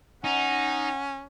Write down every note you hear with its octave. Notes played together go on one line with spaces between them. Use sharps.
C#4 D#4 F#5